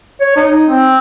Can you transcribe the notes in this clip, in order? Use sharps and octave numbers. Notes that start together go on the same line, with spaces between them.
C#5
D#4
C4